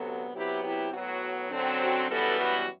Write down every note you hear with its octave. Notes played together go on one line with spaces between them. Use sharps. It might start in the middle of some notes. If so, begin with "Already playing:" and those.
Already playing: D2 C3 F#3 B3 F#4 A4
C3 F#3 B3 E4 G4
E4 G4
A2 F#3 B3 F#4
F#2 D3 F#3 C4
F#4
F#2 E3 G3 B3 F#4 A4
F#4